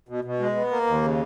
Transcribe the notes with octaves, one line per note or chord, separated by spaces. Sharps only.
B2
B2
G#3
B3
A#3
D#2
C#3